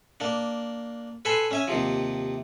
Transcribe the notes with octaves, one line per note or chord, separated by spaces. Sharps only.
A#3 D4
A4 B4 G#5 A5 B5 C6
C#4 E5 G#5
D#2 C3 F3